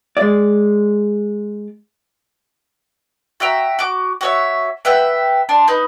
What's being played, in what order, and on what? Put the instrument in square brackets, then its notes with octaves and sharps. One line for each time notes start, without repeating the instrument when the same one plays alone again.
[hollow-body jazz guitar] G#3 D5
[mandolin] F#4 E5 G5 A#5
F#4 D6
F#4 C#5 E5
B4 E5 F#5 G5
D4 A5 C6
D#4 B4